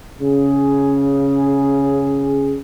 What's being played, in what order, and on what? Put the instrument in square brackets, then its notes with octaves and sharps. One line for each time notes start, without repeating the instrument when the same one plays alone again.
[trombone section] C#3 G#4